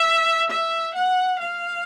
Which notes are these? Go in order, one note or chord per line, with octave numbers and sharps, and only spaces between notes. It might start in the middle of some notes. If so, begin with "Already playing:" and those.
Already playing: E5
E5
F#5
F5